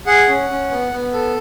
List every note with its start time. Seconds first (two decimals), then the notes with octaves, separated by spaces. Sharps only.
0.07 G#4 F#5
0.28 C#4
0.49 C#4
0.70 B3
0.92 B3
1.13 A4